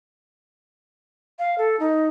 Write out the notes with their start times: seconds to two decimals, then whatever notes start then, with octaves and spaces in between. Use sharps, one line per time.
1.39 F5
1.58 A4
1.80 D#4